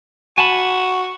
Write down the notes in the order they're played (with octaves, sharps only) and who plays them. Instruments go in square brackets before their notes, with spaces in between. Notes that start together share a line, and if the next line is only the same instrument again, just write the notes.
[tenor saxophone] F#4 [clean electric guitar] G#5 A5 B5